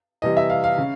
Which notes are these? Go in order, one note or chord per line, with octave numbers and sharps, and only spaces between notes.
C3 E3 G3 D#5
E5
F5
F5
C#3